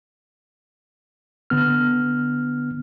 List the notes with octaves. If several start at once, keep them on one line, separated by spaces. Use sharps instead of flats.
D3 B3 F6